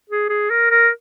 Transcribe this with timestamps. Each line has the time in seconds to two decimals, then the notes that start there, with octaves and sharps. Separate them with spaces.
0.10 G#4
0.29 G#4
0.50 A#4
0.71 A#4